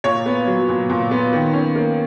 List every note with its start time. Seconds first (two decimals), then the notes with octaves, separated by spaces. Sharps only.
0.04 A#2 C#5
0.26 B3
0.47 F#3
0.69 A#2
0.90 A#2
1.11 B3
1.33 D#3
1.53 C#4
1.75 A#3